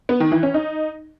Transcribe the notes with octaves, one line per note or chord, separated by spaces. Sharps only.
B3
D#3
E3
C#4
D#4